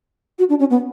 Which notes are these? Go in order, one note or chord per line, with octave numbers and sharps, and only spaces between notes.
F#4
D4
C#4
B3